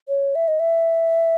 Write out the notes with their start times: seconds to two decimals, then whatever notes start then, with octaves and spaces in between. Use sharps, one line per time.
0.08 C#5
0.35 E5
0.48 D#5
0.60 E5